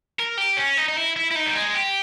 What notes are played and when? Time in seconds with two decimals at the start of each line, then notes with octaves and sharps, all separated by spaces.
0.19 A#4
0.37 G4
0.57 C#4
0.78 D#4
0.89 D#4
0.96 E4
1.16 E4
1.31 E4
1.35 D#4
1.46 G3
1.55 G#3
1.74 G4